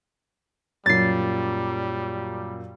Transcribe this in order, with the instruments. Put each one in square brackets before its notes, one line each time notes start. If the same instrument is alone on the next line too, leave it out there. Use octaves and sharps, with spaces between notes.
[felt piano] F#2 A#2 [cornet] G3 [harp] A6 C7